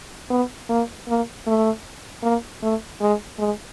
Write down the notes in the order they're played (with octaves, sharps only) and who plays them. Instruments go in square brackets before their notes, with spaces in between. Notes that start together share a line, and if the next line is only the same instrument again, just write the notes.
[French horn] B3
A#3
A#3
A3
A#3
A3
G#3
G#3